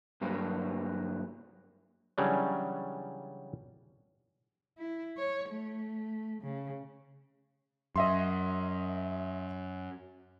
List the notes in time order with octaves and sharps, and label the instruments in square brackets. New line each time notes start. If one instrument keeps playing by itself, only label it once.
[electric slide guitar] G2 F#3 A#3
[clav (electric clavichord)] C#3 E3 F#3 G3 C#4 D4
[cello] E4
C#5
A3
C#3
[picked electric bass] F#2 [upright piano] D#5 E5 C6